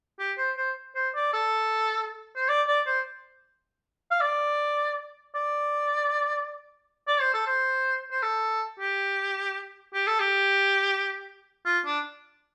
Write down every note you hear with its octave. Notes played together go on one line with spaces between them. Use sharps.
G4
C5
C5
C5
D5
A4
C5
D5
D5
C5
F5
D5
D5
D5
C5
A4
C5
C5
A4
G4
G4
A4
G4
F4
D4